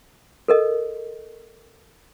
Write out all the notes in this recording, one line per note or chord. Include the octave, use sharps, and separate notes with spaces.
A4 A#4 D#5